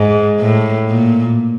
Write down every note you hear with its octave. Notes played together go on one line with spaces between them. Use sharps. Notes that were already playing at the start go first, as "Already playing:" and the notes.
Already playing: G#2
A2
A#2